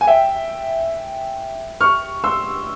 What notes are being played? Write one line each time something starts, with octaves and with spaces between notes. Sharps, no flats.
G#5
E5 G5
C#6 F6
C6 E6